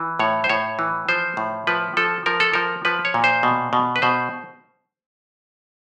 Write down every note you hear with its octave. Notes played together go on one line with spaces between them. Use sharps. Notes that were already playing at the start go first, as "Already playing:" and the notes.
Already playing: E3
A2 C#5
C5
A2 C#5
E3
F3 C5
A2
F3 B4
F3 A4
F3 A#4
A4
F3 A#4
F3 B4
C#5
A#2
C5
B2
B2
B4
B2 C5